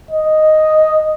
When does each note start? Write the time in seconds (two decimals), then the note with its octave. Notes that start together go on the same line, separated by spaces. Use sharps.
0.11 D#5